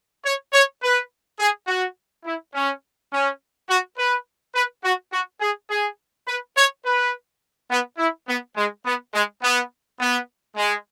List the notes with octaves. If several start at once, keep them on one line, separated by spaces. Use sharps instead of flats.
C#5
C#5
B4
G#4
F#4
E4
C#4
C#4
F#4
B4
B4
F#4
F#4
G#4
G#4
B4
C#5
B4
B3
E4
B3
G#3
B3
G#3
B3
B3
G#3